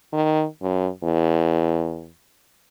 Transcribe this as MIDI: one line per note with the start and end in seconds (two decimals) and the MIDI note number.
0.13 0.45 51
0.62 0.89 42
1.03 2.09 40